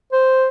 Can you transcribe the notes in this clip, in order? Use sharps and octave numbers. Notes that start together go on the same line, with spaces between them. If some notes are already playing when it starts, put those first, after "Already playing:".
C5